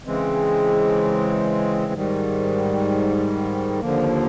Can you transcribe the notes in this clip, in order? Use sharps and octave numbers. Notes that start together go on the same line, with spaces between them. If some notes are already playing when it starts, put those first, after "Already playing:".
C#3 E3 G#3 C4
G#2 D#3 G3
D#2 D3 F3 A#3